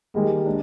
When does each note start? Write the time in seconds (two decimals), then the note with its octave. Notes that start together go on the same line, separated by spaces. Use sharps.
0.15 D#3 G3 G#3 A#3
0.46 D4